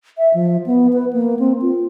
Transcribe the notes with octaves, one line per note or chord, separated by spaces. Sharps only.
E5
F3
B3
B4
A#3
C4
F4